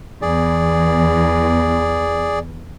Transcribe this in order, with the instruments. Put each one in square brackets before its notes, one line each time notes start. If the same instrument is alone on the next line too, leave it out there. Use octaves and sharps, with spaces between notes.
[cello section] E2 [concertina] G#4 D5